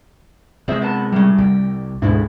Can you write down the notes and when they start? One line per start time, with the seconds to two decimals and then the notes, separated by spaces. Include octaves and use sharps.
0.68 C3 G#3 G#4 C5 E5
0.82 B3 B4 A5
1.12 A2 C#3 G3
1.38 C2 G4
2.02 D2 G#2 B2 G#3 D4 E4